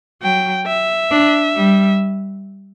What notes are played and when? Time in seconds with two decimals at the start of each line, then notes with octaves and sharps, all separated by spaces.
0.21 F#3 G5
0.66 E5
1.11 D4
1.56 G3